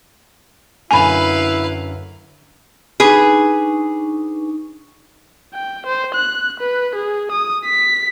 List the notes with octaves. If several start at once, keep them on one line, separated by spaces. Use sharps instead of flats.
F#2 D3 E4 B4 F5 G#5 B5 D#7
D4 D#4 G#4 B4 C#6
G5
C5
F#6
B4
G#4
D#6
B6